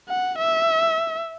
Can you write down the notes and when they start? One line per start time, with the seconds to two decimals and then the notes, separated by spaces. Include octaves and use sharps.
0.09 F#5
0.39 E5